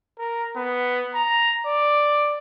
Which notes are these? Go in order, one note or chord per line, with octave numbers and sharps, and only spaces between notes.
A#4
B3
A#5
D5